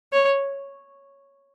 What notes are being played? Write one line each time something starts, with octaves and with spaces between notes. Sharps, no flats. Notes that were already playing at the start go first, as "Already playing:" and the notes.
C#5